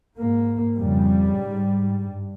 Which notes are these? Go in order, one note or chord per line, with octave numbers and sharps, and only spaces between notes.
G#2 A#3
F2 C#3 G3
G#2
G2